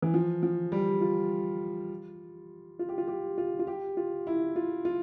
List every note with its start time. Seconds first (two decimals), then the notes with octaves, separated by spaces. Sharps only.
0.02 E3
0.14 F3
0.43 F3
0.72 G3
1.01 F4
2.79 F4
2.89 G4
2.98 F4
3.08 G4
3.38 F4
3.59 F4
3.67 G4
3.97 F4
4.27 E4
4.56 F4
4.85 F4